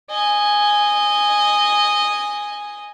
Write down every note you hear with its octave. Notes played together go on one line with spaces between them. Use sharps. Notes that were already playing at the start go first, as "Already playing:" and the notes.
D#5 G#5